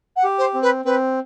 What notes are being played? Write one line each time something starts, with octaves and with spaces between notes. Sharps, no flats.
F#5
G4
C5
C4
B4
C4 B4